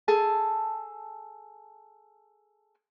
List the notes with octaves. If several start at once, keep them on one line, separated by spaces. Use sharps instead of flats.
G#4 A4 A5